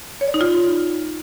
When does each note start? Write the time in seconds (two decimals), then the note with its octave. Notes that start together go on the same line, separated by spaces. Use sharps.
0.21 C#5
0.28 D5
0.34 D#4
0.41 F4